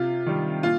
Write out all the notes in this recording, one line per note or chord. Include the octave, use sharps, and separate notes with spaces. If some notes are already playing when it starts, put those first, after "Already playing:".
Already playing: C3 F4
D#3 G3
A#2 F4